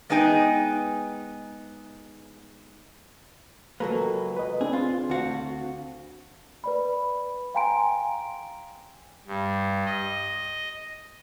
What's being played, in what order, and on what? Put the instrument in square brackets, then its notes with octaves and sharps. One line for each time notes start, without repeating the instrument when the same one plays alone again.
[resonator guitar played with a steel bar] G#3 B3 D#4 G#4 G5
[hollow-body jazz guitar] C#2 F#3 A#3 [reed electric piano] A4 B4
[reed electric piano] B4 D#5
[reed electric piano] C4 D4 [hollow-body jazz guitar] G#4
[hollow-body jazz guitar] F4
D2 F#4 F5
[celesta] B4 D5 B5
F5 G5 G#5 A#5 C6 D7
[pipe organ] G2
D#5